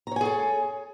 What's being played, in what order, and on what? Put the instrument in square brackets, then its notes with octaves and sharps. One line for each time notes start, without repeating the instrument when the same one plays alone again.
[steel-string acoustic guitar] A#5
C#5
G#5
G#4
A4